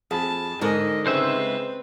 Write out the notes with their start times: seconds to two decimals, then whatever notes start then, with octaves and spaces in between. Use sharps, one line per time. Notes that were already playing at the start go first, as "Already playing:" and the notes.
0.11 F2 G#4 A5 B5
0.61 G#2 D3 A4 A#4 D#5
1.06 C#3 G#3 C4 B4 C5 E5